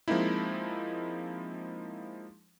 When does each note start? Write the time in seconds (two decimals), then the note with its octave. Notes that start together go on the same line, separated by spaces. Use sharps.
0.08 F3 G#3 A#3 C4 D#4 E4